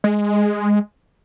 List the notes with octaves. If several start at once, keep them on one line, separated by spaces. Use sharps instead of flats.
G#3